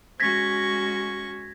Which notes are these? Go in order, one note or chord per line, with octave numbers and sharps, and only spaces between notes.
G#3 C#4 F#4 C#6 G#6 A#6 B6